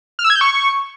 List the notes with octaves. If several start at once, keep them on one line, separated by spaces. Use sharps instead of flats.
F6
E6
G#6
G6
C#6